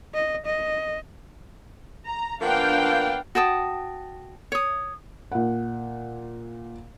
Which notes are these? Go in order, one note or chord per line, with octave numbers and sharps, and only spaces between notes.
D#5
D#5
A#5
F3 A#3 B3 D4 F5 G5
F#4 G5 A5 D#6
C#5 D#6
A#2 F#5